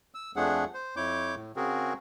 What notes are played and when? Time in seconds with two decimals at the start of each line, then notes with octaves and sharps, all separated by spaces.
0.14 E6
0.36 F2 F3 A3 D4 G#4 F#5
0.74 C5
0.96 F2 E4 C#5 D6 G6
1.36 A2
1.56 C#3 C4 F#4 G#4 A#4